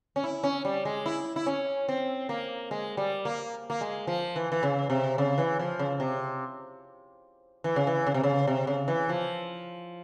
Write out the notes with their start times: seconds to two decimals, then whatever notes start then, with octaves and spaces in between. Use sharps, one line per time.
0.16 C#4
0.24 E4
0.44 C#4
0.65 G3
0.85 G#3
1.06 E4
1.36 E4
1.46 C#4
1.89 C4
2.29 A#3
2.71 G#3
2.97 G3
3.25 A#3
3.70 A#3
3.81 G#3
4.07 F3
4.36 E3
4.52 E3
4.63 C#3
4.90 C3
5.18 C#3
5.38 E3
5.59 F3
5.79 C#3
6.00 C3
7.64 E3
7.76 C#3
7.87 E3
8.07 C#3
8.14 C3
8.23 C#3
8.47 C3
8.67 C#3
8.88 E3
9.09 F3